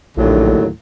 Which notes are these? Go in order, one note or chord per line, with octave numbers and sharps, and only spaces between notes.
A#1 D#2 A2 D3 F#3